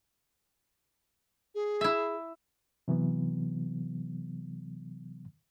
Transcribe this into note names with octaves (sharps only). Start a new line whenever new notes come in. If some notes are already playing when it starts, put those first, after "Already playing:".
G#4
E4 E5
C3 E3 F#3 B3